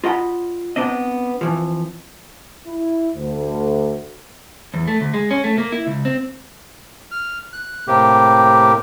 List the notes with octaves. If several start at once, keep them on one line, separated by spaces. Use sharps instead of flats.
F4 D#5 F#5 G5 B5
B3 C4 D4 D#5
F2 E3 F3
E4
D2
E2
A3
D2
G#3
C#4
A3
A#3
E4
C#2
C4
F6
F#6
A2 C3 A#3 G4